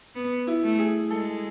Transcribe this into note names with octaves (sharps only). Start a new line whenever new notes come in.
B3
E4
A3
G#4
G#3 A4